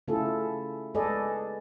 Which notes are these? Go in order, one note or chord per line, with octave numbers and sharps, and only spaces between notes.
C#3 A3 E4 F4 G#4 A4
G#3 G#4 A4 B4 D5 D#5